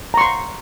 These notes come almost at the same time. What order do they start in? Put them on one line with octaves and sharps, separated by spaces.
A#5 C#6 C6